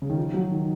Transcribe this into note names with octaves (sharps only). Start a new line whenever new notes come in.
C#3
D#3
F3
F#3
D#3